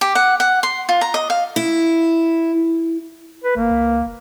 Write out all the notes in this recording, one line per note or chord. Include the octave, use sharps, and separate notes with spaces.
G4
F#5
F#5
C6
F4
A#5
D#5
F5
E4
B4
G#1 A#3
C#2
F1